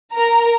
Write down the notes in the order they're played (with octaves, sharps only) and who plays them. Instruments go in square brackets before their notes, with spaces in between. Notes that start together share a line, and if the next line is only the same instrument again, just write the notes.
[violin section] A#4 A#5